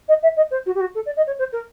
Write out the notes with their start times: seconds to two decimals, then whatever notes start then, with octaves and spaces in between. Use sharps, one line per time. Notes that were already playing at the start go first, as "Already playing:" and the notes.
0.08 D#5
0.22 E5
0.36 D#5
0.50 C5
0.66 F#4
0.74 G4
0.80 F#4
0.94 A4
1.05 D5
1.16 D#5
1.26 C#5
1.38 C5
1.52 A#4